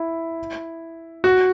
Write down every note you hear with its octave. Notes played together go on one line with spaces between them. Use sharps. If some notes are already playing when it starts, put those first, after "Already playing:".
Already playing: E4
F#4